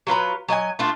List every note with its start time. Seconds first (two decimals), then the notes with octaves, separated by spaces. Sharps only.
0.07 F#3 F4 B4 A#5
0.48 F#3 D#5 E5 G#5
0.79 A3 D4 F4